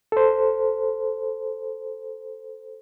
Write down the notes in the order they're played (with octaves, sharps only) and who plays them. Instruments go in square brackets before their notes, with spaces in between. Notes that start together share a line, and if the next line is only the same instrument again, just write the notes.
[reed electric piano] A4 C5